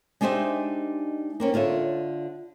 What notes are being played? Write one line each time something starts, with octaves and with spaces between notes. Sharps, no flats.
G#3 D4 D#4 G4 C5 E5
A#3 C4 C#4
D3 F4 C#5 E5